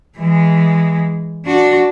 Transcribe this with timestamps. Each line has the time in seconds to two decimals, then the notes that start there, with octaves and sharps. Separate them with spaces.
0.17 E3 G#3
1.45 D4 F#4